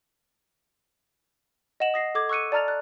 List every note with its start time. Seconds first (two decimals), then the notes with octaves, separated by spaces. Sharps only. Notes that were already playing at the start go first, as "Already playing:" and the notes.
1.80 D#5 F#5 E7 F#7
1.94 D#6 A#6 C7
2.15 A4 D6 G#6
2.29 C#6 E6 F#6 C#7 D#7
2.52 D5 A5 A#5 F6 A6 F7
2.68 F#6